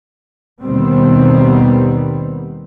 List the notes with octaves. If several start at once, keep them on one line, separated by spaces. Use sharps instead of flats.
D#2 B2 D#3 G3 B3 C4